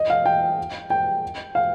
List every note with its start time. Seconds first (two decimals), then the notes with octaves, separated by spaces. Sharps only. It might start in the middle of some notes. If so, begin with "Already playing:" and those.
Already playing: D#5
0.10 F5
0.26 G5
0.90 G5
1.55 F5